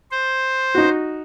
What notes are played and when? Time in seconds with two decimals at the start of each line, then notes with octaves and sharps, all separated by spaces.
0.11 C5
0.75 D#4 F#4